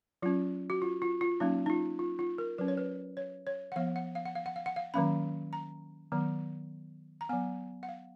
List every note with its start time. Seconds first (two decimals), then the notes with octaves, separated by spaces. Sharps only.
0.22 F#3 C#4 F4
0.70 F#4
0.82 F4
1.02 F4
1.21 F4
1.40 F#3 A#3 C#4 D#4
1.66 D#4
1.70 F4
1.99 F4
2.19 F4
2.38 A#4
2.58 F#3 C#4 B4
2.68 C#5
2.77 B4
3.17 C#5
3.47 C#5
3.72 F#5
3.76 F3 B3 F5
3.96 F#5
4.15 F5
4.26 F#5
4.35 F5
4.46 F#5
4.56 F5
4.66 F#5
4.76 F5
4.94 D#3 F#3 A#3 C#4 B5
5.53 A#5
6.12 D#3 F#3 B3
7.21 A#5
7.29 F#3 B3 G#5
7.83 F#5
7.89 F5